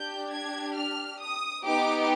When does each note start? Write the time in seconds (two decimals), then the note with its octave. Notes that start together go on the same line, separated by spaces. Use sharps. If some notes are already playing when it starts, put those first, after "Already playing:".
Already playing: D4 G4 G6
0.30 G#6
0.75 F6
1.20 D#6
1.64 B3 D#4 G4 D6